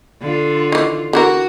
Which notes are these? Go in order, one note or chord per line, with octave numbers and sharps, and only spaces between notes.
D3 F4
D#3 E3
D3 E3 F#4 A#4